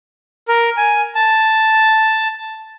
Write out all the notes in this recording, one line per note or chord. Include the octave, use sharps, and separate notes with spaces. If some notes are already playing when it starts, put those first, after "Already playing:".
A#4
G#5
A5